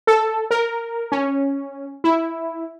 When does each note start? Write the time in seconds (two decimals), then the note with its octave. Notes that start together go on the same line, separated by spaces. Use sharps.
0.07 A4
0.51 A#4
1.12 C#4
2.04 E4